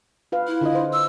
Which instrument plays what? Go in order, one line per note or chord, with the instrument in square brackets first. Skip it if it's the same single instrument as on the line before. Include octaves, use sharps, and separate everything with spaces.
[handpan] F4 B4 F5
[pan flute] E4
[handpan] D3 F4 D#5
C5
[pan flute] E6